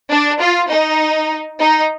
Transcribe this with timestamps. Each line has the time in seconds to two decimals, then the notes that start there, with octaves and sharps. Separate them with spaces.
0.11 D4
0.40 F4
0.71 D#4
1.60 D#4